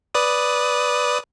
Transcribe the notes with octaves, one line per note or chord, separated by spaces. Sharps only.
B4 D5 D#6